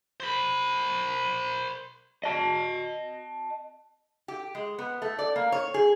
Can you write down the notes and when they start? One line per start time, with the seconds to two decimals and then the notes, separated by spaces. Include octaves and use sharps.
0.20 C5 B5
2.24 D#5 A5
4.28 G4
4.55 G#3
4.79 B3
5.02 A3
5.19 D5
5.36 A#3
5.52 C#5
5.74 G#4